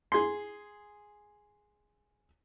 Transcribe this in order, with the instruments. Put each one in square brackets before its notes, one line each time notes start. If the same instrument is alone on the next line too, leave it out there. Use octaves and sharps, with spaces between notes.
[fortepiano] G#4 C6